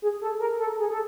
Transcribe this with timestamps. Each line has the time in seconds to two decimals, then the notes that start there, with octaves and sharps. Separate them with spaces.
0.02 G#4
0.21 A4
0.40 A#4
0.59 A4
0.79 G#4
0.91 A4